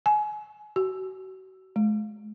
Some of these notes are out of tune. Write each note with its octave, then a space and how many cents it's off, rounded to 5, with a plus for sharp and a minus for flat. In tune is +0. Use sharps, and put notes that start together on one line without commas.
G#5 +25
F#4 +35
G#3 +40